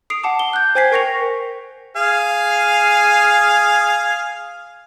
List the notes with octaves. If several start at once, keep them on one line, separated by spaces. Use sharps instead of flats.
D#6 C7 D7 F7
F#5 A5 D6
G7
F#6 G6
C5 G5 G#5 G#6 B6 C7
A#4 G5 C#6 A#6 C#7 F7
G#4 F5 G#5